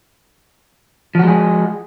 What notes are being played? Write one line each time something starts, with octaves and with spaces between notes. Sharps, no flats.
F3 G#3 F#4 G#4